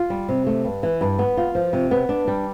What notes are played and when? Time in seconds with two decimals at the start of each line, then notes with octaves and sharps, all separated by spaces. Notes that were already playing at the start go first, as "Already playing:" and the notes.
Already playing: F4
0.10 G3
0.29 C3
0.47 A3
0.65 G2
0.83 E3
1.01 G2
1.19 B3
1.37 F4
1.55 F3
1.73 C3
1.91 B3
2.09 D4
2.28 G3